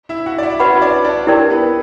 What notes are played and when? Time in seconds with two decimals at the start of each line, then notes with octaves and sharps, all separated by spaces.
0.09 E4 E5
0.26 F#4 F#5
0.38 D5
0.43 E4 E5
0.60 C#4 F#4 B4 C#5 F#5 B5
0.82 D4 D5
1.04 D4 D5
1.27 E4 G4 A#4 D5 G5
1.50 B3 B4